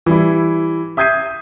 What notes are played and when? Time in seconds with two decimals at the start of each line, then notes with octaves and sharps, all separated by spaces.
0.06 E3 G3 E4
0.97 E5 D#6 G6 G#6 C7 D#7